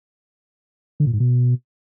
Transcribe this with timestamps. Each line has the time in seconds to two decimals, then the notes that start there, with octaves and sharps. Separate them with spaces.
1.00 D3
1.07 A#2
1.13 G#2
1.20 B2